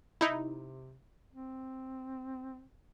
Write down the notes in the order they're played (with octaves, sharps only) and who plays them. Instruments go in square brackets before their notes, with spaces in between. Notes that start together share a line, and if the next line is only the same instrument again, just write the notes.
[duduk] C3 [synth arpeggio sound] D#4 E4
[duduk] C4